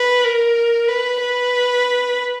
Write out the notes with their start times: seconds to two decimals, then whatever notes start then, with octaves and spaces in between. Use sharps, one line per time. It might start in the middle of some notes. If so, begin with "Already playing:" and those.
Already playing: B4
0.24 A#4
0.89 B4
1.20 B4